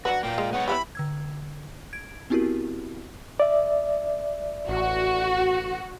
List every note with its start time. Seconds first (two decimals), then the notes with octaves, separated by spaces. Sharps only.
0.05 F#3 D4 F#4 B4 F#5
0.23 A#2 A#3 G5
0.38 G#3
0.53 B3 C#5 F#5
0.68 E4 F4 G4 B5
0.95 D3 E6 G#6
1.93 G#6 D7
2.30 B3 C4 E4 F#4 G4 A#4
3.40 D5 E5
4.69 A1 F#4